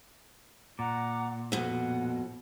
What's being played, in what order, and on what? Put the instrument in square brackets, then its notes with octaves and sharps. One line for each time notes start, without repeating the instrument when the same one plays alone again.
[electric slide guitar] A#2 [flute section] F#5 A#5 D6
[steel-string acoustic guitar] F2 B2 [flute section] F#5